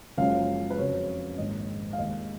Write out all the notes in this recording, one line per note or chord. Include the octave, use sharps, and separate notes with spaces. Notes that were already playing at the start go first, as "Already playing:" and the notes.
F#1 F#2 C#3 F3 G#3 F5
B4
F2 C#3 F#3 C#5
A#1 G#2 D#3 G#3 D#5
F5
D#2 D#3 G#3 D#5